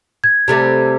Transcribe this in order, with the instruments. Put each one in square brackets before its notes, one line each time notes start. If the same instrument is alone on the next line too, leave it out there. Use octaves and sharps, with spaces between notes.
[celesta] G#6
[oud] C3 G3 A3